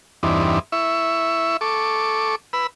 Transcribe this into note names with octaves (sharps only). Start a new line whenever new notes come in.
E2 G2 E3 C4 D4 D#4
E4 E5 C#6
A4 C#6 D6
B4 B5 E6